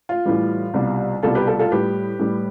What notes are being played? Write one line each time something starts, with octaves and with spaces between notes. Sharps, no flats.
F4
A2 E3 G3
C2 B2 G3
C2 B2 G3 F4 A4
G4 B4
F4 A4
F4 A4
A2 G3 G4 B4
A2 G3